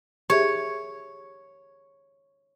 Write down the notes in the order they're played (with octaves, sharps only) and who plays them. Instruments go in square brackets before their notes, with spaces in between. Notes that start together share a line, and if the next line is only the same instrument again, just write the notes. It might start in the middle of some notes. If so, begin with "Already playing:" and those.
[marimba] G4 G#4 E5 [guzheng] C#5